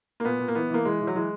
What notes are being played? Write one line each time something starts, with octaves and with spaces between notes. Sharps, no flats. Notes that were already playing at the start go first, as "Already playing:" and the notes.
A#3
A#2 B3
A#2
A#3
E3 B3
E3 A#3
E3 G#3
E3
F#3
E3 G#3